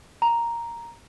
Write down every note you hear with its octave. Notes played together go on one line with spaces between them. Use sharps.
A#5